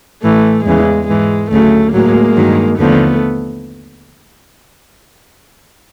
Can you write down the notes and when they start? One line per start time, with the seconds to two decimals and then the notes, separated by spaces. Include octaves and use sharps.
0.23 A2 E3 A3
0.65 E2 C#3 E3 G#3
1.08 G#2 E3 G#3
1.50 D2 C#3 F#3 A3
1.93 A2 F#3 G#3 A#3
2.36 G2 D#3 F#3
2.78 D#2 D3 F3 A3 B3